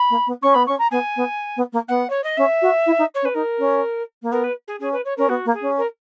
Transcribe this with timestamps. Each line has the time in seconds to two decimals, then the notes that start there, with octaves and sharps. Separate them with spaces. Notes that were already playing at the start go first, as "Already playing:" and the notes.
Already playing: B5
0.10 A#3
0.26 B3
0.42 C#4 C#6
0.54 B3 B5
0.66 C#4 C#6
0.79 A#5
0.91 B3 G#5
1.16 B3
1.56 B3
1.72 A#3
1.88 B3 F#5
2.10 C#5
2.23 D#5
2.37 C#4 E5
2.61 F#4
2.86 E4
2.98 D#4
3.15 C#5
3.22 C#4
3.25 B4
3.34 D#4 A#4
3.58 C#4
4.22 A#3
4.31 B3 A#4
4.43 B4
4.67 G#4
4.80 C#4 G#4
4.92 B4
5.05 C#5
5.17 C#4 A#4
5.29 B3 F#4
5.45 A#3
5.53 G#4
5.61 C#4
5.77 A#4